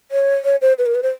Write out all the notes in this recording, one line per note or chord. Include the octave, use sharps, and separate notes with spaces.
C#5
C#5
C5
B4
A#4
B4
C5